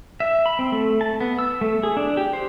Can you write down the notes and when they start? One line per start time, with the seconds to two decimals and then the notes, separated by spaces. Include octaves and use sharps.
0.20 E5
0.46 B5
0.59 C4
0.72 A3
1.01 A5
1.21 B3
1.39 E6
1.61 A3
1.83 G#4
1.97 D4
2.17 G4
2.33 C5